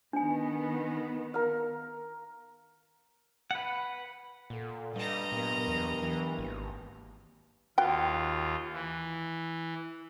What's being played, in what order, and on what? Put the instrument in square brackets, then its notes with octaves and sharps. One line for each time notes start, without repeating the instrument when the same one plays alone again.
[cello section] D#3 B3 [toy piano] D4 G#5
[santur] A#4 F5
[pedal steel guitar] B4 F#5
[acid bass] A#2 [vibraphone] A4 F#5
[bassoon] G2 [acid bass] G3 [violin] D#5 A#5
[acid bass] A#2 [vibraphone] F#3 B3 A#4
[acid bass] E2
E3
[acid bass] G#1 [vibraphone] A#3
[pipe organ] D#2 F4 [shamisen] F#4 G5
[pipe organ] E3